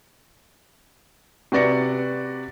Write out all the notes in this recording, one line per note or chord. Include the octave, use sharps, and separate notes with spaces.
C3 F#4 B4 D5 A#6 C#7